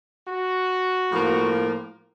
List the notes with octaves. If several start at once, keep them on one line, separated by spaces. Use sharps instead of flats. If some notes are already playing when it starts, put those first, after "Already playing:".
F#4
A2 F3 A#3